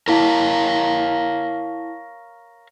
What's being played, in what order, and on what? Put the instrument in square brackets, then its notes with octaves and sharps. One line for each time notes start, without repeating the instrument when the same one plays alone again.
[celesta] E4 A5 B6 [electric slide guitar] A#4 C#5 F5